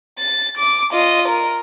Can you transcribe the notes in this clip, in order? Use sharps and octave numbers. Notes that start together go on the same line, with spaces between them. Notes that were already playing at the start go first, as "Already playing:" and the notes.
A6
D6
F4 D#5
A#4